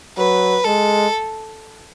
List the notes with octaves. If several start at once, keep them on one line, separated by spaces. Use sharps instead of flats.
F#3 B4
G#3 A4